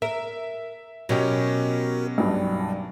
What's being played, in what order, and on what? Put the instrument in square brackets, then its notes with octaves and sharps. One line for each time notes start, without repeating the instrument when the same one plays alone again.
[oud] A#4 [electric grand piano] E5
[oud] B2 [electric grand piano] F#3 C#4 G4 [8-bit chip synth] F#4 A#4
[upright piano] B1 G2 [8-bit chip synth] D5 G5